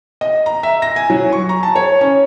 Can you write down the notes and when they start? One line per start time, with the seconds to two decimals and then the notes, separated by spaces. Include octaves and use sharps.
0.21 D#5
0.46 A#5
0.63 E5
0.82 A#6
0.96 G#5
1.10 F#3
1.32 C#6
1.49 A#5
1.63 A5
1.76 C#5
2.01 C#4